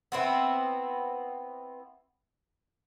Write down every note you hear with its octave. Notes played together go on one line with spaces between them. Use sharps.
B3 C4 E4